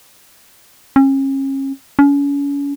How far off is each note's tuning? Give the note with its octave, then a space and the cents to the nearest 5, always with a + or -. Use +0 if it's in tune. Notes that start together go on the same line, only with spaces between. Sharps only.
C#4 -35
C#4 +35